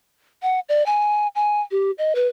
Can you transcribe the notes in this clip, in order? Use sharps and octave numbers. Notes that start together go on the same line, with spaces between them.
F#5
D5
G#5
G#5
G4
D#5
B4